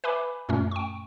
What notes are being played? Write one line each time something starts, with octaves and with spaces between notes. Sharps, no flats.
B4 E5 G#5 B5 D6
F#2 A#2 A3 C#4
G5 C#6